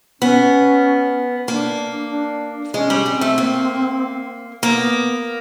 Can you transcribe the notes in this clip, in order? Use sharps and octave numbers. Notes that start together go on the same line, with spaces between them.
B3 C#4
A#3 D4
D4
G#3 C#4
G3
G3 C4
A3
A#3
A#3 B3